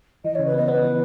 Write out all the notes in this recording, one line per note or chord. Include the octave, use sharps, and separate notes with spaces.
E3 D#5
C#5
C#3
B4
B3 D#5
B3 B4
E3